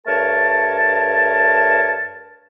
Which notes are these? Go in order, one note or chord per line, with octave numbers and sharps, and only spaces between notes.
G2 A3 A#4 C#5 A5